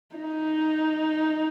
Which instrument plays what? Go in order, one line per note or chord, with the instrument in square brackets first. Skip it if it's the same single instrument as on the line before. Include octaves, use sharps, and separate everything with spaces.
[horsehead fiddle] D#4